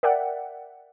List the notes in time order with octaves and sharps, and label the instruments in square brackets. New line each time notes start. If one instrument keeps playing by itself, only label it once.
[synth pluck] A#4 D5 E5 F#5 G5